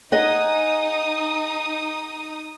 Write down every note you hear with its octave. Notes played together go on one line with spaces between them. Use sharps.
D#4 G#4 D#5 F#5 D#6